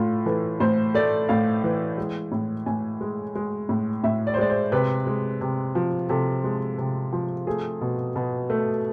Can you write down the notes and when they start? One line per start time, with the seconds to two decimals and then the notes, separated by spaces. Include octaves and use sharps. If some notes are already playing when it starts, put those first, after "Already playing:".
Already playing: A2 A3 F4
0.26 E3 A4
0.60 A2 C5
0.94 A3 D5
1.29 A2 F5
1.64 E3
1.98 G#3
2.32 A2
2.66 A2 G#5
3.01 G#3
3.35 G#3
3.69 A2
4.03 A2 E5
4.27 D5
4.34 C5
4.38 G#3 D5
4.49 C5
4.72 C3 B4
5.07 G#3
5.41 C3
5.75 F3
6.09 C3 A4
6.44 G#3
6.78 C3
7.13 F3
7.47 A3 G#4
7.81 B2
8.16 B2
8.50 A3